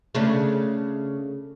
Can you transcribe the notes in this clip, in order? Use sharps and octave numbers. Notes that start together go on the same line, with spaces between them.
C#3 A3 D4